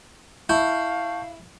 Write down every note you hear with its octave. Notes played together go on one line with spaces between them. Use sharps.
E4 F5 A5 C#6 G6